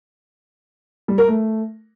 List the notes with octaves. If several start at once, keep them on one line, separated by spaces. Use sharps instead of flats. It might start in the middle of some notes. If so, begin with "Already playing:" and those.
G3
A#4
A3